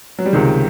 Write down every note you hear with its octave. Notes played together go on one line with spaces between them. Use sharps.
F#3
G3
C#2 C3 D#3 G#3